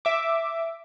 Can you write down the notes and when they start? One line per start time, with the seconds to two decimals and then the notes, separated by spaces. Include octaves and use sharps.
0.05 E5 D6